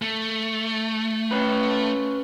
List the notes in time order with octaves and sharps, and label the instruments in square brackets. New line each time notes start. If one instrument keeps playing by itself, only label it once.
[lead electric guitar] A3
[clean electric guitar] C#4 B4